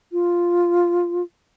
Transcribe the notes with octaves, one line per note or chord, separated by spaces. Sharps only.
F4